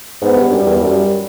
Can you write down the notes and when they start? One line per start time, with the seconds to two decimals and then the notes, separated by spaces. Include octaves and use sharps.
0.22 G#2 B3
0.36 G2
0.50 F#2 G3
0.66 E2
0.80 F#2 G3